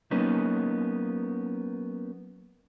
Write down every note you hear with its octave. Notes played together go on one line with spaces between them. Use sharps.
F#3 A#3 B3 C#4 D#4